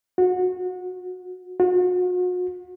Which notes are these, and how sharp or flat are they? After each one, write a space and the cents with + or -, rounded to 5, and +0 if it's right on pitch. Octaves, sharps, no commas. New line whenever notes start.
F#4 -25
F#4 -40